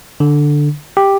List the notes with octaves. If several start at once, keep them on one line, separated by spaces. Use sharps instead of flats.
D3
G4